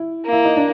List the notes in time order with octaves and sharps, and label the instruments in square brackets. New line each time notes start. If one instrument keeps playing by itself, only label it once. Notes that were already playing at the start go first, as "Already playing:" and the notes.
Already playing: [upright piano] E4
[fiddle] A#3
[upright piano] E4
D#4
D4